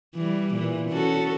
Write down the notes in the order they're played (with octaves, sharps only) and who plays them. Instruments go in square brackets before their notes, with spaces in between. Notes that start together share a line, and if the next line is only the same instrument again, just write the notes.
[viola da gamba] E3 G3
A#2 E3
C#4 F#4 A4